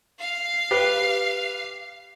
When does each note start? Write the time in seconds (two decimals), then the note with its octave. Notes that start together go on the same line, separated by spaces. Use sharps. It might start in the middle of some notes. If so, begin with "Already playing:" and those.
0.19 F5
0.71 G4 B4